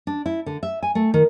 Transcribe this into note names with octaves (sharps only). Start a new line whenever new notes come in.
D4
E4
D3
E5
G#5
A3
D#3